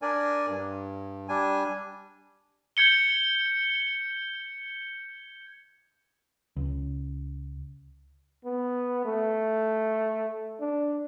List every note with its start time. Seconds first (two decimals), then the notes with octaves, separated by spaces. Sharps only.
0.02 D4 A#4 D5 G#5
0.48 G2
1.29 G3 D4 G#5
2.77 G6 G#6 C#7 G7
6.56 C#2
8.45 B3
9.05 A3
10.60 D4